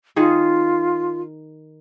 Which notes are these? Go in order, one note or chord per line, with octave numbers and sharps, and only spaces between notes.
D#3 D#4 F4 G#4